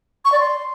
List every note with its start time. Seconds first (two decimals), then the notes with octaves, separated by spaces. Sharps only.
0.25 C#6
0.32 D5
0.40 C6